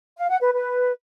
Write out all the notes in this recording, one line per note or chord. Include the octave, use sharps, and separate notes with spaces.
F5
F#5
B4
B4